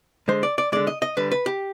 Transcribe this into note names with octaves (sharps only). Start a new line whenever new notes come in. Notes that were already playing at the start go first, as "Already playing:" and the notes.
D3 G#3 C5
D5
D5
D3 G#3 D5
D#5
D#5
D3 G3 B4
B4
G4